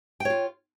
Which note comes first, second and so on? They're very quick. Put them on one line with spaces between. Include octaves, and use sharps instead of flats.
G5 C#5 F4